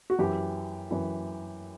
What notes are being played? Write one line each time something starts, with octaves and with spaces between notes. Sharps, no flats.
F#4
F#2 E3 G4
F#2 E3